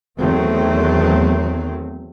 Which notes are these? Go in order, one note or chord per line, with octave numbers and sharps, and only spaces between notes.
E2 D#3 F#3 A3 B3 C4